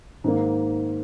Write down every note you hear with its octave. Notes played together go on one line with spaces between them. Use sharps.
G#2 D#3 A#3